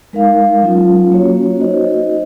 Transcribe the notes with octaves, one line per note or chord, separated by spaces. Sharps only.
G#3 D#4 A#4 F5
F#3 C#4 F4
A#3 C#4 F#4 C#5
D#4 F#4 C5 D#5
D#4